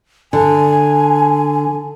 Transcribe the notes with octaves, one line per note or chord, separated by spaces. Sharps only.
D3 G#5